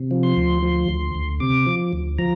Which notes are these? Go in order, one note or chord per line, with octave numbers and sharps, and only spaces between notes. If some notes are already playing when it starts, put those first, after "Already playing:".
Already playing: C3
F3
C6
D2
F3
D2
D2
C3 D6
F3
D2
F3 A#5